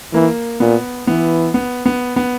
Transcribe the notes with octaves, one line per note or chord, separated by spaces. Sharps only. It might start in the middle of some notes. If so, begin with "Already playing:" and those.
E3 A#3
A#2 B3
E3 B3
B3
B3
B3